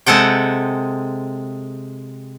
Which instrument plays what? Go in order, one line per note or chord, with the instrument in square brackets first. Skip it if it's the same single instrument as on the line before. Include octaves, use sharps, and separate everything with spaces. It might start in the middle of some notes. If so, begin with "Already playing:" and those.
[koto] C3 G#3 A4 F#5 G5